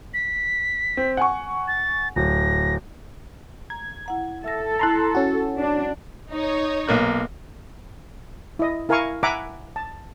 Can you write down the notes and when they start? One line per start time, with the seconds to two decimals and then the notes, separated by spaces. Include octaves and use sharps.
0.14 B6
0.97 C4
1.17 F#5 G#5 C#6
1.68 A6
2.16 D1 A#6
3.70 A#5 G#6
4.06 E4 F#5 A#5
4.44 A4 E5 E6 A#6
4.79 E4 A5 A#5 C6 F#6
5.15 C#4 F#4
5.59 D4
6.31 D#4 C#5
6.88 B1 A#3 F#6
8.59 E4 D#5
8.89 E4 A#4 F5 G#5 A#5 C#6
9.23 E5 F#5 G#5 A#5 B5 D6
9.76 A5